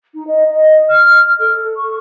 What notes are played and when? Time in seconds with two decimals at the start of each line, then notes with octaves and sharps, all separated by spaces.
0.14 D#4
0.27 D#5
0.50 D#5
0.89 F6
1.40 A4
1.77 C#6